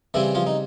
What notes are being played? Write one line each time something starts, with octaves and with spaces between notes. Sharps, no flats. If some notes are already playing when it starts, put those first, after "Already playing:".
C#3 E3 G3 C4 E4
F3 F4
D#4